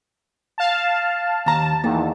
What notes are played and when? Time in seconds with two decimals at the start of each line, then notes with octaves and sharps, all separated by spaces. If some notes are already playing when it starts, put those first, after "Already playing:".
0.58 F5 A5
1.46 D#2 A5 A#5
1.84 E2 D#3 A#3